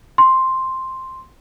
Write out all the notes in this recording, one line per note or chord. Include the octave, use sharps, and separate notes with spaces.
C6